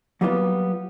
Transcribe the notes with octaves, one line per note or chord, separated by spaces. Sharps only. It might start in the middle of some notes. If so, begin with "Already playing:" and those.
F#3 G3 A#3 B3 D4 F4